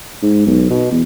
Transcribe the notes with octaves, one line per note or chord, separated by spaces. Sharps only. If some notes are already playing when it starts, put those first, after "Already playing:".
G#2
B1
B2
E2